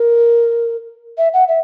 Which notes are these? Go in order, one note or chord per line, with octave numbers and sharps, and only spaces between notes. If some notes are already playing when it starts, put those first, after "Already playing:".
Already playing: A#4
E5
F#5
E5